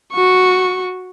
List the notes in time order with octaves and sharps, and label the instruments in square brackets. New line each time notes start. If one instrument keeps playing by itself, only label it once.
[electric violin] F#4 C#6